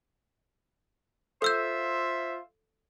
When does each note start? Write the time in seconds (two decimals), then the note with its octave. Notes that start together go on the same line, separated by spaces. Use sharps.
1.42 F4 A4 C5 E5 E6 G6